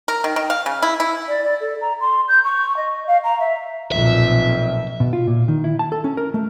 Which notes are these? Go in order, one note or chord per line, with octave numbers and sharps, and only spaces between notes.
A#4
D#3
D#3
F5
C#3
E4
E4
D5
D5
A4
A#5
C6
G6
C#6
D#5
F5
A#5
E5
B1 F2 A#2 E5
B2
F4
A#2
D#3
E4
A5
A4
C#4
A#4
A3